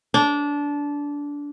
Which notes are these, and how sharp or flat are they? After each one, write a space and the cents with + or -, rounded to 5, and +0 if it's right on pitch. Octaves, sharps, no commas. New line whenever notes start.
D4 -20